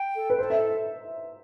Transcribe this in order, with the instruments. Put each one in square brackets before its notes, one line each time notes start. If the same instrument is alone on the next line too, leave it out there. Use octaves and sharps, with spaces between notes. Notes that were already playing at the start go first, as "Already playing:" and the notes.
Already playing: [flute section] G5
A4
[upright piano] B4
[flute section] A4 [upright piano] C5
[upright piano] E5